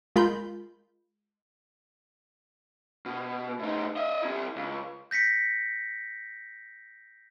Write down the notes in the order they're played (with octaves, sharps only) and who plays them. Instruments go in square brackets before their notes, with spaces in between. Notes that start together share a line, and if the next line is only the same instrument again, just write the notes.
[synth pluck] G#3 F4 A#4 B5 G6
[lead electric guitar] B2
A2 D#4
D#5 E5
C4 E4
C#2
[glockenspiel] G6 A#6 B6 C#7